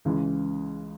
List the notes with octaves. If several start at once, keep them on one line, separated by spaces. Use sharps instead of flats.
C#2 C#3 E3 G#3